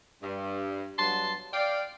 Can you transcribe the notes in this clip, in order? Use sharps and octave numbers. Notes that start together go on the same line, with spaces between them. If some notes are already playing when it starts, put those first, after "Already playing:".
G2
G2 F#3 B3 A5 C6
D5 F5 G5